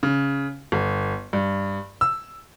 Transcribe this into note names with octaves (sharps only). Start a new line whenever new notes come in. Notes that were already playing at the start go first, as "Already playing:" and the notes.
C#3
G1
G2
E6